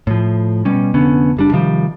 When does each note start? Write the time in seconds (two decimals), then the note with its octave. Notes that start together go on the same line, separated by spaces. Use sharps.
0.07 A2 F3
0.65 B2 G3 C#4
0.94 F1 D3 B3 C#4
1.37 F#1 G3 D4
1.51 C3 D#3 F3 G3